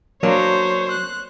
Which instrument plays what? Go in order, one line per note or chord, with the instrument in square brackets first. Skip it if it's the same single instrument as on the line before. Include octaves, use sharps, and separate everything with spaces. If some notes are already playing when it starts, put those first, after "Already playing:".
[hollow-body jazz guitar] F#3 A#3 D4 [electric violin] C5 C#5
[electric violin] F#6